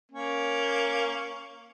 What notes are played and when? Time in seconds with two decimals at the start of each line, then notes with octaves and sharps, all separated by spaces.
0.12 A#3 C#4